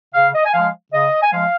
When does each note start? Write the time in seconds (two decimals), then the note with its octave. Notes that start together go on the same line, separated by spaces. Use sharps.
0.14 C#3 F5
0.34 D#5
0.45 G#5
0.53 F3 G#3 F5
0.92 C#3 D#5
1.23 G#5
1.32 F3 G#3 F5